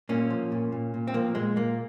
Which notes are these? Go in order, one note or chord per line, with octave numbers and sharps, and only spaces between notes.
A#2 A#3 C#4
F3
A#2
A#2
A#2
C4
F3 A#3
A#2 G#3
A#2 A#3